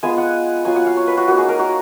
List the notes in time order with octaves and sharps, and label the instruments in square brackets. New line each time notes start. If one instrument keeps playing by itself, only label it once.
[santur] G#3 B3 F4 G#5
F#5
F#3 B3 F4 G#5
F#5
F5
C#5
B4
F#4
A#3 D#4 F#4
G#4
A#4
F#4